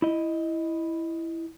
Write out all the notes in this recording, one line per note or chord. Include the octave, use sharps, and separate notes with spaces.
E4 D#5